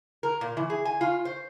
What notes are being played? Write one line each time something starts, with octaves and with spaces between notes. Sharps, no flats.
A#4
A#2
E3
G#4
G#5
F4
C5